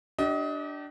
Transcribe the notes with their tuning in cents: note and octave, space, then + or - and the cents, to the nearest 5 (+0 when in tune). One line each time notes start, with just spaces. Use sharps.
D4 +0 G4 -35 D#5 +30